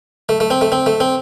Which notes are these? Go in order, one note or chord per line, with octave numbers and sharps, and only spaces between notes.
A3
A3
C4
A3
C4
A3
C4